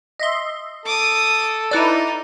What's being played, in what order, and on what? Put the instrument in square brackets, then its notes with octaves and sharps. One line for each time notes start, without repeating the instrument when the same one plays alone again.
[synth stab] D#5 E5 C6
[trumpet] A4 [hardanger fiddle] D6 D#6
[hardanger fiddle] D#4 [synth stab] E4 B4 D5